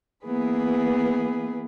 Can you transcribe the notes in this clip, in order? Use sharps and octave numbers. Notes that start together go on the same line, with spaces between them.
E3 A#3 B3 G#4 B4